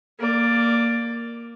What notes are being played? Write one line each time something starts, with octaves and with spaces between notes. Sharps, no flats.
A#3 D5